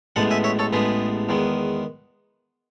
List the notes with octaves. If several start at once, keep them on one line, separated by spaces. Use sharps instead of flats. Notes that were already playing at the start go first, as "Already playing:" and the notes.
A1 A2 G#3 B3 F#5 A5
E5 G#5
C#5 E5
A4 C#5
A1 A2 G#3 B3 G#4 B4
E2 D#3 G#3 B3